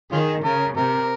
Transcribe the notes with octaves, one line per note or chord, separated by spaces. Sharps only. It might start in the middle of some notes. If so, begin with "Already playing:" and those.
D#3 C#4 F4 G#4
C#3 A#4
C3 A#4